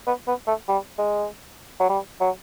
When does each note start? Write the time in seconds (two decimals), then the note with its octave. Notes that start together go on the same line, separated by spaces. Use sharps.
0.07 B3
0.28 B3
0.47 A3
0.68 G3
0.98 G#3
1.80 F#3
1.89 G3
2.20 F#3